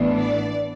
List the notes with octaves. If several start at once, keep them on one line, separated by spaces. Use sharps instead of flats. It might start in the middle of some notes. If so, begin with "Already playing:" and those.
Already playing: A1 A2 E3 B3 D4
D5